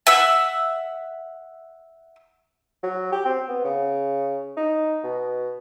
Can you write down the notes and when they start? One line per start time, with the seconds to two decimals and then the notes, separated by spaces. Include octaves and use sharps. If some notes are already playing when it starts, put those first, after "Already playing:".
0.07 E5 F#5 E6
2.83 F#3
3.12 G4
3.25 C4
3.49 B3
3.64 C#3
4.57 D#4
5.03 B2